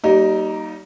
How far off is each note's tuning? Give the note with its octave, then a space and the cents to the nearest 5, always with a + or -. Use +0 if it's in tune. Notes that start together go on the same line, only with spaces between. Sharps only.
G3 -35 A#3 +0 D#4 +0